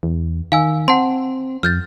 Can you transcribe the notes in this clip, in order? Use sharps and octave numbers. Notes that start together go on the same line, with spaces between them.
E2
D#3 F5 G#5 E6
C4 F#5 A5 C6
F2 F6 G6 A6